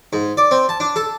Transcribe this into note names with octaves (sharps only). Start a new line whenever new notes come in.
G#2
D5
C4
A5
D4
A4